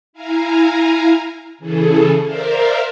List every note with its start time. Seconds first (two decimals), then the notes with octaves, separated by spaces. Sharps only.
0.13 E4 F5 G#5 A#5
1.58 C#3 E3 G#4 A4
2.23 A#4 C5 D5 E5 F5